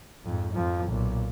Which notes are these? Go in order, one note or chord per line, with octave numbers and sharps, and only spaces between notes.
F2 G#2
F2 F3
B1 A#2